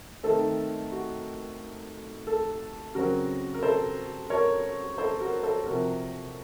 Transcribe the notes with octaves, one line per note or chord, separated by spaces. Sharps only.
D#3 A3 C4 A4
F#4
A4
C#3 F#3 C4 F#4 A#4
A#4
A4 C5
A#4 C#5
A4 C5
F#4 A#4
A4 C5
C3 F3 C4 F#4 A#4